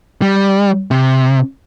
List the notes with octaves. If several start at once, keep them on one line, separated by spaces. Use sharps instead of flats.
G3
C3